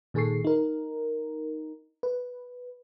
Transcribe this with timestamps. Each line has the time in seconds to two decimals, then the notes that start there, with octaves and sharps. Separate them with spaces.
0.14 A#2 D#3 G#4 A4 C#6 C7
0.44 D#4 A#4
2.03 B4